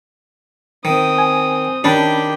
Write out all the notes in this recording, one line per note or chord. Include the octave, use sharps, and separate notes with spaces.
D#3 C4 D#6
G#5
D#3 C#4 D4 G4 A5 B5